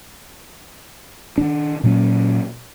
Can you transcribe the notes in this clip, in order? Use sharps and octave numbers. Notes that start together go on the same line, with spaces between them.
D#3 D4
A#2 F#3 A#3 C#4